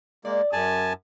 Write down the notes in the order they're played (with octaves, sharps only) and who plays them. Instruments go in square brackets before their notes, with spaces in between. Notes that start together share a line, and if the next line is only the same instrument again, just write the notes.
[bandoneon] G#3 A#3 [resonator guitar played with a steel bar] D5
[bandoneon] F#2 G#5 A5 [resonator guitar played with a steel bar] C#4 G#4